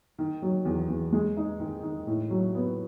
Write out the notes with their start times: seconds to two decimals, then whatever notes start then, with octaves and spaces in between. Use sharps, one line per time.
0.18 D#3
0.42 F#3
0.65 E2
0.89 E2
1.13 G#3
1.37 D#4
1.60 D#3
1.83 D#3
2.07 A2
2.30 F#3
2.55 B3